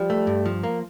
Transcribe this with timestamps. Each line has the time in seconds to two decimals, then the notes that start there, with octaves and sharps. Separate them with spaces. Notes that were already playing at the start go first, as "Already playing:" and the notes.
Already playing: F3 G3
0.10 A3
0.27 G2
0.45 F3
0.63 A#3